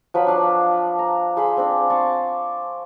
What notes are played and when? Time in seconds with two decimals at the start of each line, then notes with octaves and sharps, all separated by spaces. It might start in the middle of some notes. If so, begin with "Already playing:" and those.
0.14 F3 F#3 B4 B5
0.27 D4 F5
0.99 A#5
1.37 G#4 C5 F5 B5
1.57 C4 D4
1.90 D5 A5 C6 C#6